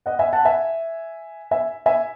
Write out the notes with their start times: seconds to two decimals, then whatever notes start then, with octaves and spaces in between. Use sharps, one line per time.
0.06 D#5 F#5
0.19 E5 G#5
0.33 F#5 A5
0.45 E5 G#5
1.51 E5 G#5
1.86 E5 G#5